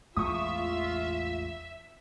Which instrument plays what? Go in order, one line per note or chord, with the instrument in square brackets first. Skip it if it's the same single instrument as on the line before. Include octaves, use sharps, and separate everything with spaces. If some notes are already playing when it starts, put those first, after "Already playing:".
[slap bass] A1 E2 G#3 [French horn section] F4 [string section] E5 [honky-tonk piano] C#6 D#6